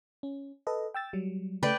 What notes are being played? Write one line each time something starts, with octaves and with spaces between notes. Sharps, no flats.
C#4
A4 B4 D#5
G5 E6 A6
F#3 G3
C#3 A3 B4 D5 G5